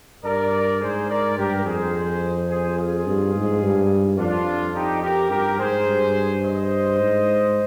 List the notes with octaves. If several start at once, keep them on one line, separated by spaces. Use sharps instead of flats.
G2 A#4 D5
G#2 G#4 C5
A#4 D5
G2 G4 A#4
F2 G#4 C5
G#4 C5
F4 G#4
G2
G#2
G2
F2 D4 F4
D#4 G4
G4 A#4
G2 G4 A#4
G#2 G#4 C5
G2
C5 D#5
G#2